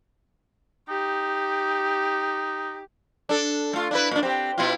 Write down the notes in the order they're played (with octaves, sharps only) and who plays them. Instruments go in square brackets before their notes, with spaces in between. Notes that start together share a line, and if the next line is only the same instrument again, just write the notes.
[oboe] D#4 [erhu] G4
[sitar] D4 A4
A3 F4
D4 E4 B4
A#2 D4
C4 G4
B2 E4 F4